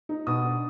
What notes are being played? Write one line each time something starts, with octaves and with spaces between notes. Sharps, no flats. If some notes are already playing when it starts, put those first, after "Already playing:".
D#4
B2 D#6
D4